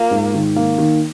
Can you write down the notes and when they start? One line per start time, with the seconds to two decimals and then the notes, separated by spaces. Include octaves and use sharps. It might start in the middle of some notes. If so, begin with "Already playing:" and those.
Already playing: A#3 F4
0.11 G#2
0.34 D#3
0.56 A#3
0.78 D#3